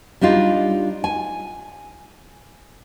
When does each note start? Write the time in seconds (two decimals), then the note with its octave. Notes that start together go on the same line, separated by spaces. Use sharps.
0.21 G3 D4 D#4 F4
1.04 G#5